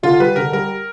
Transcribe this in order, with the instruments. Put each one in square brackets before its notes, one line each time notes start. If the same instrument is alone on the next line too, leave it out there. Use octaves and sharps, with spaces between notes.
[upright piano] D3 [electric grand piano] F4
[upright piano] G3 [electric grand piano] B4
[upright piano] D3 [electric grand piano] A#4
[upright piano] G3 [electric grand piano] A#4